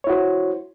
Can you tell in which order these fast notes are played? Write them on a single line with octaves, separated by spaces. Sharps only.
C#5 E4 F#4 C5